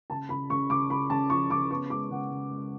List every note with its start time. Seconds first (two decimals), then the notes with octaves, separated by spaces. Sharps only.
0.10 C#3 A5
0.29 C#3 B5
0.50 C#3 C#6
0.70 C#3 D6
0.90 C#3 B5
1.10 C#3 A5
1.30 F3 C#6
1.50 C#3 D6
1.71 B3 C#6
1.90 G#3 D6
2.10 C#3 F#5
2.30 C#3
2.51 G#3